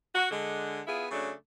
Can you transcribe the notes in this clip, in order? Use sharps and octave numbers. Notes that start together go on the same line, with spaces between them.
F#4
D3 G#3
B3 E4 F4 G#4
C#3 F#3 A3 D4